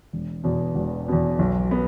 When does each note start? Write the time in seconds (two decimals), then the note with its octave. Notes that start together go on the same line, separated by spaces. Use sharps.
0.13 E1
0.44 E2 B2
0.75 E1
1.08 E2 B2
1.39 B1
1.71 B3